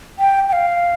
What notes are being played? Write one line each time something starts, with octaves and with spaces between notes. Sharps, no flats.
G5
G5
F5